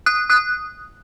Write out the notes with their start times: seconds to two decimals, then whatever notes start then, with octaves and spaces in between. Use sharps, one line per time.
0.06 D#6 F#6
0.30 D#6 F#6